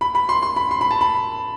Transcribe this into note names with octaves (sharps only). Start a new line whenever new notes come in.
B5
B5
C6
C6
B5
C6
B5
A5
B5